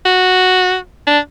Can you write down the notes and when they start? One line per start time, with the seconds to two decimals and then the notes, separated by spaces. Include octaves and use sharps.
0.05 F#4
1.07 D4